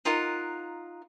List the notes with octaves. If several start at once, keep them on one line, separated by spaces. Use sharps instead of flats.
D#4 F4 A#4 F#5